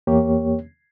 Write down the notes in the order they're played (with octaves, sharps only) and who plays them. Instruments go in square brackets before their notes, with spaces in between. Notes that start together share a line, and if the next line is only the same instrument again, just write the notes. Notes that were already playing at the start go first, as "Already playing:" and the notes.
[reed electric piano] E2 A#3 G4 C#5